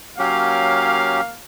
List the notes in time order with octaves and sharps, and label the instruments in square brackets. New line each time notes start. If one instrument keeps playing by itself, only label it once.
[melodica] F#3 C#4 G4 [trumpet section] A#3 F5